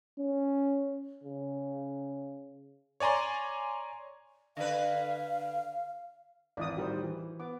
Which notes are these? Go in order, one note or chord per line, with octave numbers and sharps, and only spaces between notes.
C#4
C#3
C#5 D5 G#5 A#5 C6
D3 B4 F5
G#1 E3 D5 D#5 D#6
A2 D#3 G3 F#4 A#4 C5
E3
B3 D6